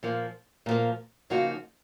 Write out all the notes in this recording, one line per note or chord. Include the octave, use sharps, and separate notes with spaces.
A#2 F3 A#3
A#2 F3 A#3
C#3 F3 A#3 D#4 F#4